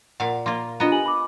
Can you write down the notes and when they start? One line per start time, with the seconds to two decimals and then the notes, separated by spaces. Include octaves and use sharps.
0.20 A#2 F5 F#5
0.46 A#3 F4 C6
0.80 B3 D4 F4 D#5 A#5
0.92 G4 G#5 F#7
1.06 B5 D6